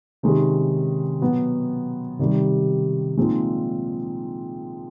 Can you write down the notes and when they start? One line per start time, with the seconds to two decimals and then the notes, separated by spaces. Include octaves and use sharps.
0.23 C3 D#3 G#3 C#4
1.21 B2 F#3 B3
2.19 C3 D#3 G3
3.17 A#2 F3 G#3 C4 D#4